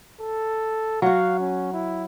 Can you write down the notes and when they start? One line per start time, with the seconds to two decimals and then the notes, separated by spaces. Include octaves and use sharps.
0.21 A4
1.02 F#3 F#4 F5
1.40 C#4
1.73 E4